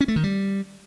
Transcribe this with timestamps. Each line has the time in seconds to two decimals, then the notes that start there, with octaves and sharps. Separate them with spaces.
0.01 C#4
0.08 A3
0.16 D#3
0.24 G3